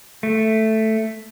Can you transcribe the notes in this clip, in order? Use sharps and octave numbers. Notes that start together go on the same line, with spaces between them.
A3